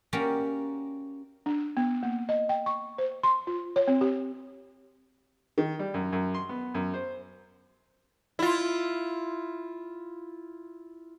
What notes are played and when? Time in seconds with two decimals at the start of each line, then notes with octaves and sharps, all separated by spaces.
0.13 A#3 C#4 F#4 G4 D5 F#5
1.46 D4
1.77 B3
2.03 A#3
2.29 D#5
2.49 G5
2.66 C#6
2.98 C5
3.23 C6
3.47 F4
3.76 C#5
3.88 C4
4.01 G4
5.58 D#3
5.79 G3
5.94 F#2
6.12 F#2
6.34 C6
6.49 B3
6.75 F#2
6.94 C5
8.39 E4 F4